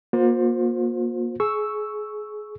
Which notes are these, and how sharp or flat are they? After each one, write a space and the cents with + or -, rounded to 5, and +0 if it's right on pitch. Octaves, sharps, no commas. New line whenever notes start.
A#3 +30 F4 +45 C5 +0
G#4 +25 C#6 +0 E6 +0